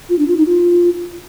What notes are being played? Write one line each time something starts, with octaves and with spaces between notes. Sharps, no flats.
F4
D4
F4
D#4
F4